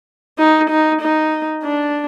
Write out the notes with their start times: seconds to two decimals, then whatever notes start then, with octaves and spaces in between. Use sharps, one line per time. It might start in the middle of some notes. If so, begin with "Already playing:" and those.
0.39 D#4
0.70 D#4
1.02 D#4
1.64 D4